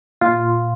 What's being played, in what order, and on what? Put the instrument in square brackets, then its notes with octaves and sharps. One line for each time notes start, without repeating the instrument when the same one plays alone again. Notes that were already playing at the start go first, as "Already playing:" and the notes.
[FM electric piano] A#2 F4